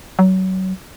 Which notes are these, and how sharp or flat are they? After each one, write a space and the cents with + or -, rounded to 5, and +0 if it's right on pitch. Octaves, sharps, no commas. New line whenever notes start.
F#3 +25